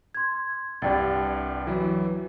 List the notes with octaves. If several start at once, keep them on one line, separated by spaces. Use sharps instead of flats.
C6 G#6
C2 G2 G4 D5 G5 A6
E3 F#3